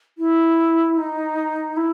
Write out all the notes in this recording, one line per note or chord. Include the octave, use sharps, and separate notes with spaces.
E4
D#4
E4